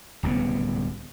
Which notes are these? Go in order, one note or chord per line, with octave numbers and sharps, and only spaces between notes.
D1 C2 C#3 B3